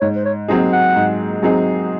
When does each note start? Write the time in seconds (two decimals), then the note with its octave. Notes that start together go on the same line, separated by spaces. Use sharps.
0.01 G#2 C#5
0.16 C5
0.25 C#5
0.48 F#3 C4 D#4 G#4 D#5
0.73 F#5
0.96 G#2
1.42 F#3 C4 D#4 G#4